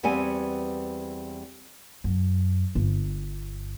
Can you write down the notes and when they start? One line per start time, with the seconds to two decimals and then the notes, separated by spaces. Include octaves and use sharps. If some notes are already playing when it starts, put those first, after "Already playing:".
0.03 E2 G3 B3 C4 G#5
2.04 F#2
2.75 G1